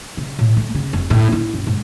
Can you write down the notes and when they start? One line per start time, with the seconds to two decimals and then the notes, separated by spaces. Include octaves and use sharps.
0.17 C#3
0.39 A2
0.57 A3
0.74 C#3
0.93 F1
1.10 A2
1.33 E4
1.54 F#2
1.67 G#2